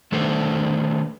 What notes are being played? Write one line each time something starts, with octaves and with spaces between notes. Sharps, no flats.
D#3 A3 D4 A4 B4 C5